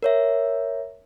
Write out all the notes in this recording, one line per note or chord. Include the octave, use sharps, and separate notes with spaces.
A#4 C#5 E5